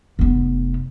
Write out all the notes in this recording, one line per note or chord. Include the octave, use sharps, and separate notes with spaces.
F1 B3